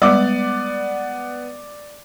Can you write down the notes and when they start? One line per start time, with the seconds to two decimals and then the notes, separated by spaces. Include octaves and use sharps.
0.02 G3 G#3 B3 D5 D6